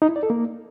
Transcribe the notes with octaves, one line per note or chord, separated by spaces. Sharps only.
D#4
E4
D5
A4
A#3